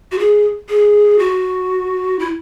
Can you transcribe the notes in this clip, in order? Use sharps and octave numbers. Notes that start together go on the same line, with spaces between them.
F#4
G#4
G#4
F#4
E4